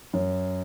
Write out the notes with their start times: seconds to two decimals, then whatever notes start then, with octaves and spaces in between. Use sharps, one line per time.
0.13 F#2